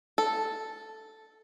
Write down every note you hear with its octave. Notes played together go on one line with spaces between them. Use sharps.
A4